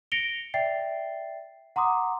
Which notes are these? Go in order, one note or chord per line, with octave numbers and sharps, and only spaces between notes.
A#6 C#7 D7 F7 G7
D5 E5 G5 A6 C7
F#5 A#5 C6 D6 D#6